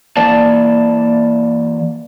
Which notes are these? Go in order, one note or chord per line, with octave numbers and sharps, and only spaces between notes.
E3 A#3 D5 A5